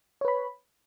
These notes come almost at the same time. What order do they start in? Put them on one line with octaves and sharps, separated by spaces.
C#5 B4 B5